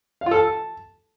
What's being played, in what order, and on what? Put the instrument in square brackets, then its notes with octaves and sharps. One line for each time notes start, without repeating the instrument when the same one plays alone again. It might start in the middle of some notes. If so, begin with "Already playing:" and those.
[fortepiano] F5
F4
A4
A5